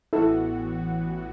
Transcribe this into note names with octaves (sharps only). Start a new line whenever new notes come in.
A1 A2 E3 B3 E4 F#4 A4